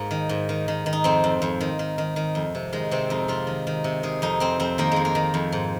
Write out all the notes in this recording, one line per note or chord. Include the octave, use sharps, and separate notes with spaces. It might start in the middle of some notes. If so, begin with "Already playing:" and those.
Already playing: G#2 A#3
D#3
G#2
D#3
D#3
D#3
D#4
F2 C4
F2
F2
D#3
D#3
D#3
D#3
F2
C3
D#3 G#3
C3 C4
F2 D#4
C3 F4
D#3
D#3
C3
D#3 G#4
F2 D#4
F2 C4
F2 C4
D#3 A#3
F2 G#3
A#3
D#3
F2
G#2